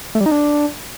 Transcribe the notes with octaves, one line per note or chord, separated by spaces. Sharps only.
A3
G3
D#4
D4